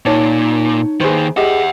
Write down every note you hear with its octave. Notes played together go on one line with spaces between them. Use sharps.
A#2 D#4 C#5 A5
D#2 D#3 G#4 B4 C5
G4 G#4 D#5 E5 F#5